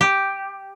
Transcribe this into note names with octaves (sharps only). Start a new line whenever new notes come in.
G4